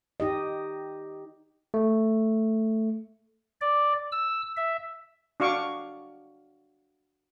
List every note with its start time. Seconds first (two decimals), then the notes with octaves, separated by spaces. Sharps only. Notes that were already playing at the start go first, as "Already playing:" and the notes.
0.20 D#4 G4 D#5
1.74 A3
3.61 D5
4.12 E6
4.57 E5
5.40 D4 F#4 F5 C#6 D6